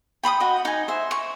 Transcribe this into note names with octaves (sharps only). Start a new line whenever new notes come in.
G5 B5 C6 D#6
F#4 D#5
D#4 G#5
C5 E5
C#6